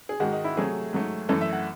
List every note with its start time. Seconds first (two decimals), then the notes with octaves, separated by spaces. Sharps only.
0.09 G#4
0.20 G#2 D#3 G#3 F#4
0.33 D#4
0.44 E4
0.56 C3 F#3 A3 G#4
0.93 G#2 F#3 A3
1.29 F#2 E3 A3 A4
1.41 E5
1.53 F#5